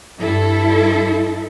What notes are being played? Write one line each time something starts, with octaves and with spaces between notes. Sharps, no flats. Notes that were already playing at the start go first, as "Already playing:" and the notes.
G2 E4 A4